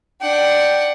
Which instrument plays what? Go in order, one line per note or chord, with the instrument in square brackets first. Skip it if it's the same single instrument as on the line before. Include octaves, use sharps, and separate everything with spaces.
[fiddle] D4 F#5 [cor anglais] G5